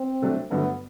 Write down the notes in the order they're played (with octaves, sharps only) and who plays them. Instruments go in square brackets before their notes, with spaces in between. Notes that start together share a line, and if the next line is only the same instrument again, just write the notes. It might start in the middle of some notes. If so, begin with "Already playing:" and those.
Already playing: [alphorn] C4
[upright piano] C3 F#3 A3 D4
[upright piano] G2 D3 F#3 A3 [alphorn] B3